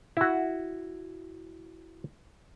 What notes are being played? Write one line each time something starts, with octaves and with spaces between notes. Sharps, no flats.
E4 F#4